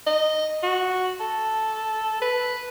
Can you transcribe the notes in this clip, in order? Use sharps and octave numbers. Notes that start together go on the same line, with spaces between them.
D#5
F#4
A4
B4